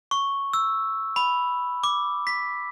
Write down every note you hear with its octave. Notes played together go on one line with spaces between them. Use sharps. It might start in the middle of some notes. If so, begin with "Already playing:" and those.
C#6
E6
B5
D6
B6